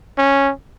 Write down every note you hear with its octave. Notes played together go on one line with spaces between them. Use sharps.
C#4